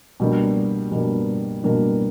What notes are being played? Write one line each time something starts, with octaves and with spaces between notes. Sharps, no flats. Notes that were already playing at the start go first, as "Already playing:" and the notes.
B2 G3 A#3 D4
B2 G3 A#3 D4
B2 G3 A#3 D4